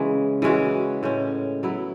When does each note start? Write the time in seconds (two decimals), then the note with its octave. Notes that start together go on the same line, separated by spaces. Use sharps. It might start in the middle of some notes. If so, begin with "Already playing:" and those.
Already playing: C#3 E3 G#3 C#4
0.42 E3 G#3 C#4 F#4
1.03 A2 G#3 C#4
1.63 F#3 B3 E4